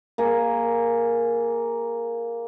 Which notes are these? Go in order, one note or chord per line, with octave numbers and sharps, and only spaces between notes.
A#3 G#4